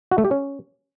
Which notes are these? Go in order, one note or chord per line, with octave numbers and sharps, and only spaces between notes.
F#4
A3
G4
C#4